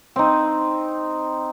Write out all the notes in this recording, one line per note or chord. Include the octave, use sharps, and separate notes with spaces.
C4 D#4